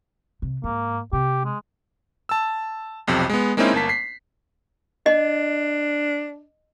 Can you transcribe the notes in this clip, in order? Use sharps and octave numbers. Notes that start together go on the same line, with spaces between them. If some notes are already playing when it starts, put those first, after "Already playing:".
C3
G#2 A#3
C3 G4
G#3
A5 E6
B1 F2 C3
G#3 B3
G#3 A#3 C4 C#4 D#4 E4
G1 A#3 A5 B6
B6 C7
D4 D#5